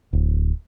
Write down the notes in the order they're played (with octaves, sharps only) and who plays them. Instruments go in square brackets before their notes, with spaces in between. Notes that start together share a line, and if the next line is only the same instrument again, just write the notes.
[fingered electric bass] D1